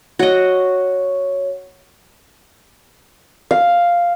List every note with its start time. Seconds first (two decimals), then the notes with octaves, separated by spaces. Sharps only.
0.19 F#4 C#5 D#5
3.51 F5